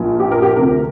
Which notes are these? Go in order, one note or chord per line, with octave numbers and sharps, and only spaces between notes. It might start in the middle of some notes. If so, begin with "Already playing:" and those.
Already playing: A#1 A#2 F3
G4
A#4
G4
D2 C3 F3 A#4